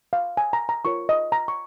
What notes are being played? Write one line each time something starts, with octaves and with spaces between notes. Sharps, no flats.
F5
G#5
A#5
A#5
F4 A#4 C#5 C#6
D#5
A#5
C#6